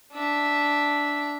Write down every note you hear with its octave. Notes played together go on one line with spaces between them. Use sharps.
D4 E5